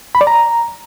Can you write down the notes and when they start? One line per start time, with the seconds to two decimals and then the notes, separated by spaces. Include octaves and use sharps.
0.15 B5
0.21 D5
0.27 A#5